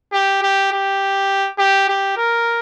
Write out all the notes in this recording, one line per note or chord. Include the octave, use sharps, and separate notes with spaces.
G4
G4
G4
G4
G4
A#4